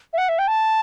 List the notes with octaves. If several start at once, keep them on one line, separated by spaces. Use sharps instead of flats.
E5
F#5
E5
G5
A5